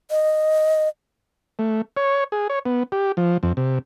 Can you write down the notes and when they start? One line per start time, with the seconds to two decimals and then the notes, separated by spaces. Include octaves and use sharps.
0.11 D#5
1.59 A3
1.97 C#5
2.32 G#4
2.50 C#5
2.65 B3
2.92 G4
3.17 F3
3.43 F2
3.57 C3